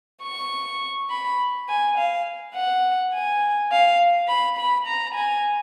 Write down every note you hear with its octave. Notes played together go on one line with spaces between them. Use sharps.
C#6
B5
G#5
F5
F#5
G#5
F5
B5
B5
A#5
G#5